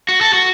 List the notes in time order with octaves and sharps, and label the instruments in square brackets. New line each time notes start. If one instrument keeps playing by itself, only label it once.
[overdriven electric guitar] F#4
A4
F#4